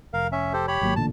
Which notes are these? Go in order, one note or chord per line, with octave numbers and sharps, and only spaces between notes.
F1 A#4 F5
C#4 E5
G4 A4 C5
G4 C#5 B5
G#1 F#3 A#3
A1 A#2 D3 A5